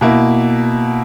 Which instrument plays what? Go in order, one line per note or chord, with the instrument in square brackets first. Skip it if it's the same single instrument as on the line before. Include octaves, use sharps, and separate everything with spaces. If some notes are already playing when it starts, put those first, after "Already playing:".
[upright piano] B2 A#3 E4